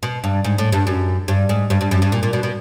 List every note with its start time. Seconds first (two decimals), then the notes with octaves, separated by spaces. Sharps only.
0.03 B2
0.24 G2
0.44 G#2
0.58 A2
0.72 G2
0.87 F#2
1.28 G2
1.49 G#2
1.70 G2
1.81 G2
1.91 F#2
2.02 G2
2.12 A#2
2.23 A#2
2.33 B2
2.43 B2